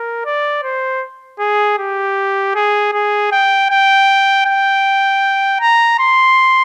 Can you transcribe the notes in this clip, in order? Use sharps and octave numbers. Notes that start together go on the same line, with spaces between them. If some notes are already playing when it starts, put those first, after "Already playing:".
Already playing: A#4
D5
C5
G#4
G4
G#4
G#4
G5
G5
G5
A#5
C6